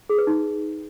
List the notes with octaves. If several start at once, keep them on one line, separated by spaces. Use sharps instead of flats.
G#4
B4
D#4